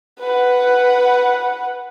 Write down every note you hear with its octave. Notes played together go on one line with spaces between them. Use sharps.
B4 F#5